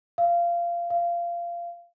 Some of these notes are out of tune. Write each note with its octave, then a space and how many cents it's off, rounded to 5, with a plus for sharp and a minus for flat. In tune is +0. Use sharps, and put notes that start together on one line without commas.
F5 -20
F5 -20